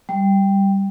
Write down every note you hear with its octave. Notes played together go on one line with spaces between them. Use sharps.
G3